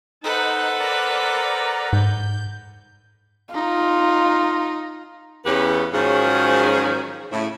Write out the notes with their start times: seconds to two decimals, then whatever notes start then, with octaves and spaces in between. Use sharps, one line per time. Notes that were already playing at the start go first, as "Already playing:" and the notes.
0.24 D#4 A4 B4 C5 F#5
0.80 A#4 D5 A#5
1.93 G#2 G6
3.54 D#4 F4
5.45 E2 C#3 B3 C#4 G4 B4
5.94 G#2 D#3 F3 F#3 C#4 G#4
7.31 A2 C#3 E4